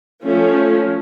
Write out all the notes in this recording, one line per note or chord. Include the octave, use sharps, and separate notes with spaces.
F3 A3 C#4